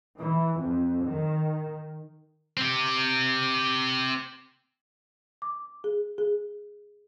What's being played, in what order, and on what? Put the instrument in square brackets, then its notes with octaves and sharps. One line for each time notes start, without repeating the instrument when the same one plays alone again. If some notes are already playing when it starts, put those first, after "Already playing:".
[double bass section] E3
F2
D#3
[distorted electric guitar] C4 G4
[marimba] D6
G#4
G#4